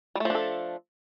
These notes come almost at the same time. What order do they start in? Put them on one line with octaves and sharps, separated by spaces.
G3 A3 F3 D4 A4